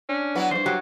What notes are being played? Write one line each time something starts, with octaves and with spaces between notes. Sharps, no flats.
C#4 D4
F#3 B3 E4
E2 G2 C5
F#3 G4